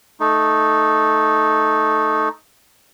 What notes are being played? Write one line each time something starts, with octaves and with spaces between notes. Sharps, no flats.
A3 D#4